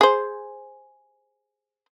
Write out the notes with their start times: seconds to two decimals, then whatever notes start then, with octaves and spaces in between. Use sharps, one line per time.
0.01 G#4 C5